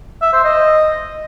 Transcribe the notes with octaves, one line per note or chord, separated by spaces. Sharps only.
E5
C5
D#5